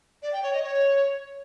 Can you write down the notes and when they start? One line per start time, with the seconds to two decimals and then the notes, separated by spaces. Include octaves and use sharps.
0.23 D5
0.33 G5
0.43 C#5
0.53 D#5
0.63 C#5